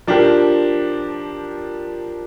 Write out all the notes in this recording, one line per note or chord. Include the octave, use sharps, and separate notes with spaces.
F3 D4 G4 A#4